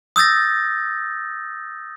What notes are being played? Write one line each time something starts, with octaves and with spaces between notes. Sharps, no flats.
D#6 E6 G6 A6 A#6